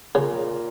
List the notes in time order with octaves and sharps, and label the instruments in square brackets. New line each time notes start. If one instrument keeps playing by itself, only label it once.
[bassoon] A#2 [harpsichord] C#3